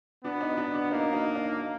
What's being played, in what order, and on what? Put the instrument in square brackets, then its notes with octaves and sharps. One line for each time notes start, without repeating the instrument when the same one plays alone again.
[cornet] B3 [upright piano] D4
[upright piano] D#4
D4
D4
[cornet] A#3 [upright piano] D#4
[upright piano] D#4
D#4